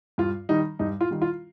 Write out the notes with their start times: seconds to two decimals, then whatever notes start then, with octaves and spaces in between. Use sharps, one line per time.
0.18 G2 F4
0.49 D#3 G3 D#4
0.79 G2 D#4
1.01 F4
1.11 D#3 G3
1.22 F4